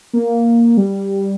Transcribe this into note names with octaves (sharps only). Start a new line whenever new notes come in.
A#3
G3